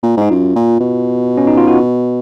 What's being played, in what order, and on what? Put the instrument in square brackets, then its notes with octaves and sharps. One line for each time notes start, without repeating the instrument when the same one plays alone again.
[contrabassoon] A#2
[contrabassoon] G#2 [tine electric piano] D#4
[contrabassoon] F#2 [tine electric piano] F4
[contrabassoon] A#2
B2
[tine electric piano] C#4
D#4
F4
F#4